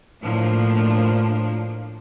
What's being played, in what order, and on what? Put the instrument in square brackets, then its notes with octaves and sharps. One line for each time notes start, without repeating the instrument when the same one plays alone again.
[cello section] A2 F3 A#3 D4